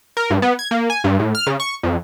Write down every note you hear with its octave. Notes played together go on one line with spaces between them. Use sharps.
A#4
G2
B3
G#6
A#3
G#5
G2
A2
F6
C#3
C#6
F2